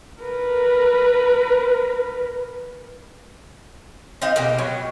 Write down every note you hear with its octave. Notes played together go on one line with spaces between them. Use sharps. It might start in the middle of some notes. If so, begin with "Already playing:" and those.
A#4 B4
C4 D#4 D#5 F5
B2 A#3 G4
F#3